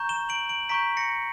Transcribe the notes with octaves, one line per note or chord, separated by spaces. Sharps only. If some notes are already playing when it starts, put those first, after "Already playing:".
Already playing: A#5 C#6 G6
E7 G7
D7 F#7
D7 F#7
A#5 C#6 G6 B6 D7
A#6 C#7